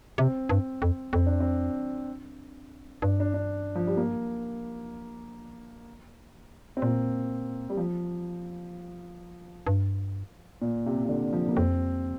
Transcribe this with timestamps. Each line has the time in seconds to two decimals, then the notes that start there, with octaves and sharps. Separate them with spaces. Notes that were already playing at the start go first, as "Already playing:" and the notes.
0.18 C3 C4
0.49 G2
0.82 F2
1.13 F2 C4
1.26 D4
1.40 C4
3.02 G2 D4
3.20 D4
3.34 D4
3.75 F3
3.87 G3
3.97 A#3
6.77 C4
6.82 A#2 A#3
7.70 G3
7.77 F3
9.67 G2
10.62 A#2
10.86 C3
11.04 C3
11.09 D3
11.32 F3
11.48 A#3
11.57 F2 C4